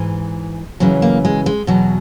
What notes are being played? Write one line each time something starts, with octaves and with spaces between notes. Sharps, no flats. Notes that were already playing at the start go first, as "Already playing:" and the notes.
Already playing: G#2 E3
F#2 C#3 E3 F#3
A#3
G#3
G#3
E2 B2 F#3